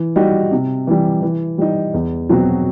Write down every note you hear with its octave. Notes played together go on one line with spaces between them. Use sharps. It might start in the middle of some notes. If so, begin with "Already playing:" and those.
Already playing: E3
G3 D#4 F#4
C3
E3 G3
E3
G3 D#4
E2
B2 F#3 C4 F#4